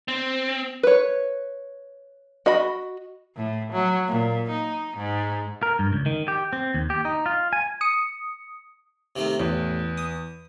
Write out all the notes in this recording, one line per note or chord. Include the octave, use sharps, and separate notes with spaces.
C4
B4 C#5
F#4 D#5 B5
A2
F#3
A#2
D#4
G#2
A#4
G2
C#2
D#3
G4
C4
D#2
G4
D#4
F4
G#5
D#6 C#7
C3 D#3 A3
A1 E2
D#6